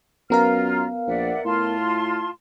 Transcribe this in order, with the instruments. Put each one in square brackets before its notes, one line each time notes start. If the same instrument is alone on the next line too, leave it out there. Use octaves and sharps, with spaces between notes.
[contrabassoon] F#2 [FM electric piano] B3 A#4 F5 [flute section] F4 A#5 F6
[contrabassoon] A#1 [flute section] D5 E5 F#5
[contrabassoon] A2 [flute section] F4 A5 C6